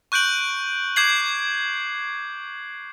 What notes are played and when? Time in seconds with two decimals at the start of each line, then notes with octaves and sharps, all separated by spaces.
0.12 C#6 F#6 G6 D7 F#7
0.96 D6 G6 G#6 C7 F#7